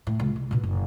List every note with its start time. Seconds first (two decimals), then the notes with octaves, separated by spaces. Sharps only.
0.07 A2
0.20 C#2
0.36 C2
0.51 A#1 B2
0.63 F#1